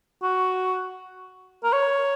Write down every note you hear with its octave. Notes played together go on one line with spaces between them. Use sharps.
F#4
A#4
C#5